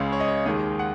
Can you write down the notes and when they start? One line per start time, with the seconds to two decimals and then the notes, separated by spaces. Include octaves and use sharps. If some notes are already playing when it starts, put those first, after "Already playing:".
Already playing: C#2 C#3 G#3
0.12 C#5
0.20 D#5
0.28 C#5
0.46 D#2 D#3 G#3 D#5
0.79 F#5